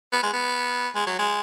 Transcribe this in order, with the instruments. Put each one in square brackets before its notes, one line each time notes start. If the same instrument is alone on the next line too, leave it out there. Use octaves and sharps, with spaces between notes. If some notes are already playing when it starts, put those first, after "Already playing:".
[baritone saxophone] B3
G#3
B3
G#3
F#3
G#3